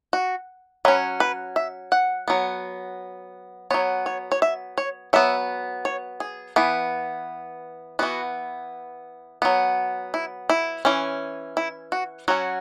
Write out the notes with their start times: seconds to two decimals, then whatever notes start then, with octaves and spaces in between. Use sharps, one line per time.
0.13 F#4
0.85 F#3 C#4 B4
1.20 B4
1.56 E5
1.92 F#5
2.28 F#3 B3
3.70 F#3 B3 C#5
4.06 C#5
4.32 C#5
4.42 E5
4.78 C#5
5.13 F#3 B3 E5
5.85 C#5
6.20 G#4
6.56 E3 B3
7.99 E3 B3 F#4
9.42 F#3 B3
10.14 E4
10.50 E4
10.85 E3 C#4
11.57 E4
11.92 F#4
12.28 F#3 C#4 F#4